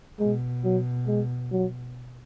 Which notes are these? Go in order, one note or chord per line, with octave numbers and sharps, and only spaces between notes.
B2 G#3
F#3
G#3
F#3